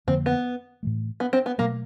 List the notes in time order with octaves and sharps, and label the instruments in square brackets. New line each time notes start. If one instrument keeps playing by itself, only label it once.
[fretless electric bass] F2 D3 F3 A#3 [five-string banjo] C4
[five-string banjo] B3
[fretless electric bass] A2 E3 A3
[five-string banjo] B3
C4
B3
[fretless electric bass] B2 F#3 A3 [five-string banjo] A#3